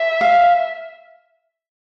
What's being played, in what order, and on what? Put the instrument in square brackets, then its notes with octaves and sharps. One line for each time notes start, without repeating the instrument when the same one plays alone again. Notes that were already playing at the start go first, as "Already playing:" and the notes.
Already playing: [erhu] E5
[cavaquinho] F5